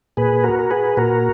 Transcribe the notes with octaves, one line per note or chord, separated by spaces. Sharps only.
A#2 G#4 B4
F#4 A#4
A#4
G#4 B4
A#2 F#4 A#4